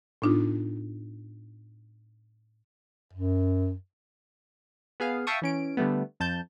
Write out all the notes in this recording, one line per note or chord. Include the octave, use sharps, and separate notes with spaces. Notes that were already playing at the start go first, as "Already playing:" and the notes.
A2 B3 D4 D#4 F4
F#2
B3 G#4 F5
E5 F5 G5 A5 C#6 D#6
E3 C#4 D7
D3 G3 A3 B3
F2 A5 G6